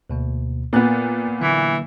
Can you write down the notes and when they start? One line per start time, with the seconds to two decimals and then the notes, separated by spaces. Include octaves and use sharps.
0.10 D2 B2 A#3
0.73 A#2 B3 A#4 F#6 A6
1.41 D3 E3 F#3 A#3